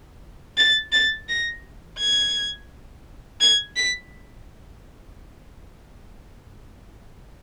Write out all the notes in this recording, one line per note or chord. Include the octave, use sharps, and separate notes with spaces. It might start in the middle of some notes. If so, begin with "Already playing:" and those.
A6
A6
A#6
G#6
G#6
B6